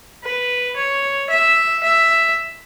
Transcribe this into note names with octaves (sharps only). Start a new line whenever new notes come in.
B4
C#5
E5
E5